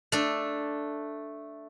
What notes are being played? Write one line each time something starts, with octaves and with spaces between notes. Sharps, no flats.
A3 D4